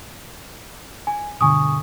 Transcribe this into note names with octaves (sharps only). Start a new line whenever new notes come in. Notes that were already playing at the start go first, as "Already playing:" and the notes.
G#5
G2 B2 D3 G#5 C#6 D#6